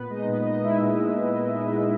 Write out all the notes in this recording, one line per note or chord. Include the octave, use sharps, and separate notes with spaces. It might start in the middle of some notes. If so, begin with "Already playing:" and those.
Already playing: A#2 B3 B4
G#3 D#4 D#5
A#2 B3 B4
G#3 D#4 D#5
G#3 E4 E5
A#2
G#3
G#3
A#2
G#3
G#3